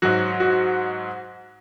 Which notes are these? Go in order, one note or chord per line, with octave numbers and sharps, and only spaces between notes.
G#2 F#3 F#4
F#4